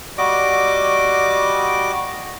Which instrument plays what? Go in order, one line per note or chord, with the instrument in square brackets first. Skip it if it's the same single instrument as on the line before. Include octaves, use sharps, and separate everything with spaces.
[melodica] G3 F#4 D#5 D6